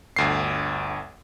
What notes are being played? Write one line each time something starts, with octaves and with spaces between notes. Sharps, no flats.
G1 D2 C7